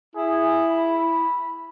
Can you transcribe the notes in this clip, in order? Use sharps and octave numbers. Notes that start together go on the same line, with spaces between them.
E4 G#4
B5